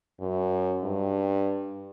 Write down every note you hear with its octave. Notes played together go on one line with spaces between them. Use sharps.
F#2
G2